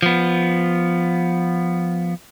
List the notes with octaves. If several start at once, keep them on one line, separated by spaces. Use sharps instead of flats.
F3 B3